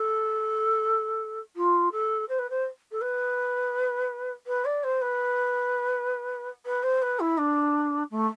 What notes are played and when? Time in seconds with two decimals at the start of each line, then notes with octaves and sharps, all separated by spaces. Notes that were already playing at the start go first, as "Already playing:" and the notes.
Already playing: A4
1.56 F4
1.92 A4
2.29 C5
2.39 B4
2.50 C5
2.92 A4
3.01 B4
4.47 B4
4.65 D5
4.83 C5
5.01 B4
6.65 B4
6.83 C5
7.02 B4
7.20 E4
7.38 D4
8.11 A3